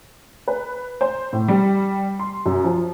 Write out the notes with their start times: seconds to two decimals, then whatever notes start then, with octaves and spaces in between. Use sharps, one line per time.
0.48 B4
1.01 C5
1.33 A2
1.48 G3
2.19 C6
2.46 F#2
2.64 F3